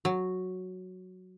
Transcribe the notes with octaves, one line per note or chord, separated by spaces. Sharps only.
F#3